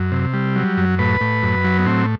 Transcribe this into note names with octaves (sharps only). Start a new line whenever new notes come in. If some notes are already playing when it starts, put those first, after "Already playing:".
Already playing: F#2
C3
G3
F#3
F#2
A2 B4
A2
F#2
F#3
B3
A2 C4